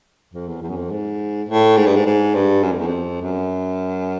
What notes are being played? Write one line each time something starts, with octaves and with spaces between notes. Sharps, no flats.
F2
E2
E2
F#2
F2
G#2
A2
G#2
G2
G#2
G#2
G2
F#2
F2
E2
F2
F#2